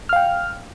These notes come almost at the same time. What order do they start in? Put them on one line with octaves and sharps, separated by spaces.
F6 F5 G5